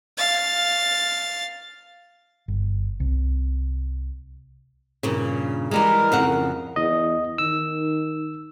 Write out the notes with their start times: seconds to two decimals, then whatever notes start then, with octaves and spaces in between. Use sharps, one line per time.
0.18 F5 A6
2.48 G1
3.00 C2
5.03 G2 A#2 C#3
5.71 E3 G3 G#3 A#4
6.12 F2 C#3 F#5
6.76 E2 D#5
7.38 D#3 E6